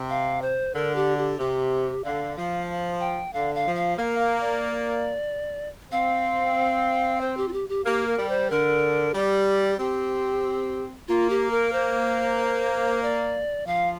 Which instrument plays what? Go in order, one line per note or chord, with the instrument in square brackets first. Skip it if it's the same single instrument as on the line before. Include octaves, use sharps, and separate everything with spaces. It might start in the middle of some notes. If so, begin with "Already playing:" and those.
Already playing: [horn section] C3
[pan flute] F5
C5
[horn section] D3 [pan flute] A#4
[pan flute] G4
G4
[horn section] C3 [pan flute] G4
[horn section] D3 [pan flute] F5
[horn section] F3 [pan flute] F5
[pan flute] G5
[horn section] D3 [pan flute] F5
[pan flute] F5
[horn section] F3
[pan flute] F5
[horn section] A#3 [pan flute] F5
[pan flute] F5
D5
[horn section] C4 [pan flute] F5
[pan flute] C5
G4
F4
G4
G4
[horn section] A#3 [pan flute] G4
[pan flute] A#4
[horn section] G3
[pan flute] C5
[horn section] D3 [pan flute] A#4
[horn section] G3 [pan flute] G4
[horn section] C4 [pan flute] G4
[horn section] A#3 [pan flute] F4
[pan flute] G4
A#4
C5
D5
[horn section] F3 [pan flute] F5